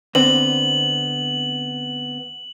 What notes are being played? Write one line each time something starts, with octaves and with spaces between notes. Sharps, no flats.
D3 B3 C4 F#7